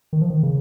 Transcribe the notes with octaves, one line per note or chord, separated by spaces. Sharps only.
D#3
F3
D#3
C#3